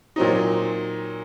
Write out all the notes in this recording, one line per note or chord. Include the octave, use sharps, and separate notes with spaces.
A#2 F#3 C4 D#4